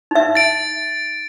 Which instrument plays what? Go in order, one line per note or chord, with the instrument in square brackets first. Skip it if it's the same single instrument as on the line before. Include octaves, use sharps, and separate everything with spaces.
[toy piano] D#4 E5
[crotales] A6 D7